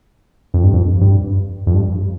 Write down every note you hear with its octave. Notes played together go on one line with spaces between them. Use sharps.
F2
G2
F2
G2
F2
G2